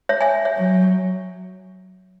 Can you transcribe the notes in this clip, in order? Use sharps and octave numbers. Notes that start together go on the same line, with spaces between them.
C#5 E5
E5 G#5
C#5 E5
F#3